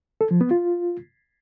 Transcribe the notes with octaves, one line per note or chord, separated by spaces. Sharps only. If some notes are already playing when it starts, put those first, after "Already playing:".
A4
F3
B3
F4